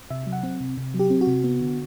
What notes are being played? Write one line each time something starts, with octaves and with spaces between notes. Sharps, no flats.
C3 E5
F#3
F#5
C4
C3
C3
F#3
G4
C4
F#4
C3
B3
D3